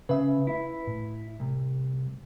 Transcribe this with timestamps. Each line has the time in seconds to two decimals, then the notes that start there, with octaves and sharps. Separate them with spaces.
0.09 C#3 B4 E5
0.47 E4
0.87 A2
1.40 C2